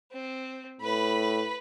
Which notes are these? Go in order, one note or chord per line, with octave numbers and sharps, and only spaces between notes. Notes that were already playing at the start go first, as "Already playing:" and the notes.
C4
A2 B4 B5